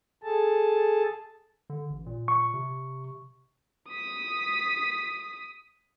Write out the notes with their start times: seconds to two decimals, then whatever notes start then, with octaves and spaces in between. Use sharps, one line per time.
0.23 G#4 A4 A5
1.70 D3
1.90 A1
2.06 A#2
2.28 C#6
2.54 C3
3.89 D#6 B6